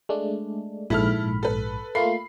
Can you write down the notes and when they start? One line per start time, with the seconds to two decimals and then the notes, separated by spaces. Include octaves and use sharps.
0.09 G#3 A3 D4
0.90 A#1 G#2 E4 A4 B5 F6
1.43 A4 B4
1.95 A3 A#3 F4 B5 C7